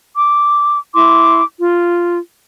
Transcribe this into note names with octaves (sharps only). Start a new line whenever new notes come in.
D6
E4 C6 D6
F4